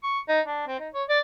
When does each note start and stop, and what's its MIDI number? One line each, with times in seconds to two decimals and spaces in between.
0.03 0.19 85
0.28 0.40 63
0.45 0.63 62
0.67 0.79 60
0.80 0.88 63
0.94 1.03 73
1.09 1.20 74